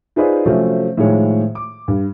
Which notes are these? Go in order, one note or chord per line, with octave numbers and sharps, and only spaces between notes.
D#4 F4 G#4 B4 C5 D5
C3 F3 F#3 A3 C4 C#4
A2 D#3 F3 G#3 C#5
D6
G2